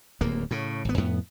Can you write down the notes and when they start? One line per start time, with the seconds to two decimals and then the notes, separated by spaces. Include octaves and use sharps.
0.21 D1 D#2 A#3
0.51 A2 C#3
0.85 G#1 B3
0.98 F2 A2 B3